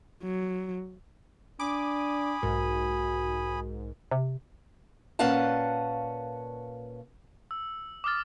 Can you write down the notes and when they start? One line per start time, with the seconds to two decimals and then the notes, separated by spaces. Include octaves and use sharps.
0.23 F#3
1.60 D4 G#5 B5 D6 D#6
2.43 B1 G#2 F#4 A#4
4.11 C3
5.19 A#2 C#4 B4 F5 F#5 A5
7.51 E6
8.04 D6 D#6 F6 A6